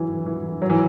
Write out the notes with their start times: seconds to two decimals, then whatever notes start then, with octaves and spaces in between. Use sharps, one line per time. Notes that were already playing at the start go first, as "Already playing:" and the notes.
Already playing: E3 F#3
0.26 E3
0.62 F#3
0.70 E3